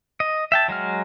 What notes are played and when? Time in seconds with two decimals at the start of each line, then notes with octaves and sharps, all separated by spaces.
0.20 D#5
0.52 E5 G5 A5
0.68 F#3 G#3 F#4 F6